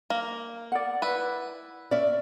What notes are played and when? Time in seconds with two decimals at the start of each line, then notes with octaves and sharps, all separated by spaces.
0.10 A#3
0.72 D5 F#5
1.02 E4 B4
1.91 C#4 D5 E5